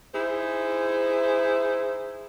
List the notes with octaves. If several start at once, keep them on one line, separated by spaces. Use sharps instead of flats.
D#4 E4 G#4 C5